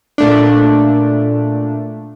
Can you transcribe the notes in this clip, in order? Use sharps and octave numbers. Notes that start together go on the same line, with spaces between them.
A#2 A3 D4